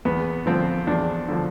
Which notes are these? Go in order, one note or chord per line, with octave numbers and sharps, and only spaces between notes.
E2 B3
D3 F3 C4
E2 D4
D3 F3